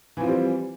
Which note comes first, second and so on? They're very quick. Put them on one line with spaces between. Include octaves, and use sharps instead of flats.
E3 F3 C4 G3